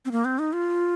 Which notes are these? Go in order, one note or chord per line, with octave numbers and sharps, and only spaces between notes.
C4
A#3
C4
D#4
F4